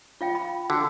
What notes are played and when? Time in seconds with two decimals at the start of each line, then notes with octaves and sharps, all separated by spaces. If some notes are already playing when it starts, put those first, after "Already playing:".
0.21 F4 F5 G5
0.35 B5
0.70 D3 F#4